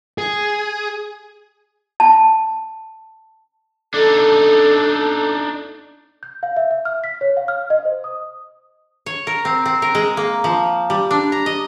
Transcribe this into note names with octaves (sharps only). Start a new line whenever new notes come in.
G#4
A5
D4 D#4 A4
G6
F5
E5
E5
F6
B6
C#5
F5
F6
D#5
C5
D#6
C#5
A#4
C4
C4
A#4
G#3
A#3
F3
G3
D4
A#5
D#5